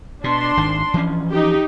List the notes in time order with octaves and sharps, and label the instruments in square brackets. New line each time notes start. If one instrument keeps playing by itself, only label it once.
[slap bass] B2 [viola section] D4 C6
[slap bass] G#1 D#3
E3 F3 C#4
[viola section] D#4 G4